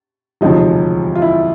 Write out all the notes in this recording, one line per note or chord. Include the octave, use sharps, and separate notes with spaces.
E1 D2 C3 F3 D#4
F4
E4